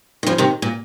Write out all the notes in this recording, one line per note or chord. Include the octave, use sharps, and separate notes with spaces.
D#3
C#3 F3
C3 D#3
A#2